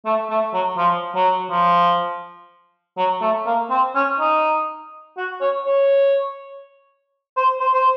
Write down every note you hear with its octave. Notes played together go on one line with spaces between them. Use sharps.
A3
A3
F#3
F3
F#3
F3
F#3
A3
A#3
C4
C#4
D#4
F#4
C#5
C#5
C5
C5
C5